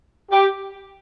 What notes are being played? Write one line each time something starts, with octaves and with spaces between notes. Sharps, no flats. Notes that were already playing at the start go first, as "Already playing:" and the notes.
G4